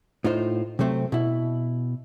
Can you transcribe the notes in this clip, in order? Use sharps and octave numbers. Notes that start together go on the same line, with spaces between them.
A2 D#4 F4 C5
C3 F#3 A3 C4
B2 E4